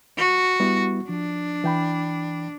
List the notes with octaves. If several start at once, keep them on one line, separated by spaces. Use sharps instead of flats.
F#4
G3 B3 E4
F3 D4
E3 G5 B5